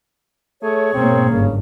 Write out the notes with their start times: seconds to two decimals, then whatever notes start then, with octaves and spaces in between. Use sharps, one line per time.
0.63 A3 G#4 C#5
0.94 G#2 B2 A#3 C4
1.30 G1 G#2 C#3